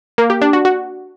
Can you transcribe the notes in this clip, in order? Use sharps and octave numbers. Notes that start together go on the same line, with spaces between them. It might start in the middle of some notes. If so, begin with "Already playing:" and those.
A#3
G4
D4
F#4
F#4